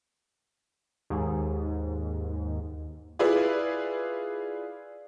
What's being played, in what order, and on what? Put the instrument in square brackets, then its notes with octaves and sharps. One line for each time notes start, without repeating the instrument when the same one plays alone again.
[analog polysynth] D#2 G#2
[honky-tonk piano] E4 F4 G#4 B4 D5